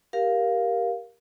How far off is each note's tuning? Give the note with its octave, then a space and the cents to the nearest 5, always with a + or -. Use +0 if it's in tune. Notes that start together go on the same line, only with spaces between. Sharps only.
G4 +0 A#4 +10 F5 +0